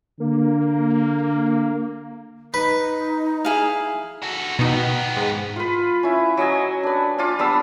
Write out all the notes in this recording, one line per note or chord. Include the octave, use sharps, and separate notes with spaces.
D3 A#3
D#4 B4
E4 G#4 F5
F#4 A4
B2 D#3 B3 D#4
G#2
F4 B4
C#4 E4
F#3 C#4 D#5 G#5
D4 B4
F4 D5 F5 C6
G3 B3 D4 E6